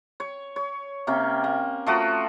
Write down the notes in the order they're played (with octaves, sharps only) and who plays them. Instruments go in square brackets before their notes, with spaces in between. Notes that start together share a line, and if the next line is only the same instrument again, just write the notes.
[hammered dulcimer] C#5
C#5
C3 A#3 C#4 G5
A#3
F3 A3 F#4 A#5